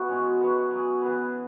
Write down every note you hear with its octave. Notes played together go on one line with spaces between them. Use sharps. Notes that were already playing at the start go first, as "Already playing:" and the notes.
Already playing: E3 B3 F#4 B4
B2 G#3 C#4
G#3 B3 F#4 B4
F#3 E4 G#4
E3 B3 G#4 B4